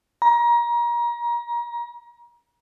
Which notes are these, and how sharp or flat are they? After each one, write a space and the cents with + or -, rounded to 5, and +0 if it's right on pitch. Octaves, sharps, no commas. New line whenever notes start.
A#5 +30